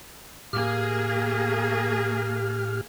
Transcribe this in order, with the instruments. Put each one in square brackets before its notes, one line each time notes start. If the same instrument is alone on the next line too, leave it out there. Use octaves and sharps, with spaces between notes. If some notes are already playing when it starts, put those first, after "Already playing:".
[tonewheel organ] A2 G4 F6 [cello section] A#3 G#4